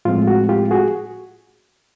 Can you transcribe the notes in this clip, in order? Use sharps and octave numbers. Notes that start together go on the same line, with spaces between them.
A2 F3 G#3 C4 F4
F#4
F4 G4
F#4 G#4